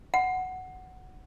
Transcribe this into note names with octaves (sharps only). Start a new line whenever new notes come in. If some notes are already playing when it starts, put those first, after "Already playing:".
F#5